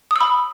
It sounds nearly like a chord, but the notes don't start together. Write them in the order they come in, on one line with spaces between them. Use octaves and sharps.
D#6 E6 B5